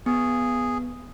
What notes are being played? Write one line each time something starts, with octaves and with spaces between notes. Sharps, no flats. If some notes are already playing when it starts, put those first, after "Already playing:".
B3 G#4